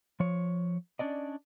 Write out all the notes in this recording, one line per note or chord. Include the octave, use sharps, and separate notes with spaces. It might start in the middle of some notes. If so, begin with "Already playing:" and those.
F3 C#5
C#4 D4 D5 D#5